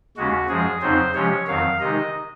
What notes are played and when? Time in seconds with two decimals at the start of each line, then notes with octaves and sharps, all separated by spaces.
0.17 D#2 C#3 G#3 C#4 F#4
0.49 F#2 F3 G#3 G#4
0.82 F2 C#3 F#3 C4 D#4 C5
1.14 C3 F3 G#3 C#4 C#5
1.47 F2 D#3 F#3 F5
1.80 C3 D#3 G#3 D#4 D#5